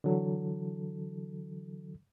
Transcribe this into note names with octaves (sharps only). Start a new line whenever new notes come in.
D3 E3 F#3 A4